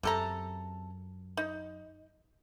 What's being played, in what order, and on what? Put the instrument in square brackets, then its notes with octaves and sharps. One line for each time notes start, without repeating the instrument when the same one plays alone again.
[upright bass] F#2 [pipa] C3 A4 A#5
[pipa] D#4